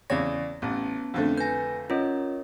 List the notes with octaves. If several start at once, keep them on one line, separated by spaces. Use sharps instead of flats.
E2 C#3 C#5 D5 A#6
A1 B3 C#4 A5
F2 D3 A3
B4 G#5 G6 A#6
C#4 F4 A#4 C#5 D#5